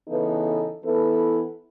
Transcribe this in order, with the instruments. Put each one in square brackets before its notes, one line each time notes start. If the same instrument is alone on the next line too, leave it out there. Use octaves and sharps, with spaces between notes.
[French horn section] C#3 E3 B3 D#4 A4
E3 B3 E4 A4